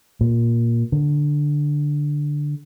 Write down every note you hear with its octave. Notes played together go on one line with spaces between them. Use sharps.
A#2
D3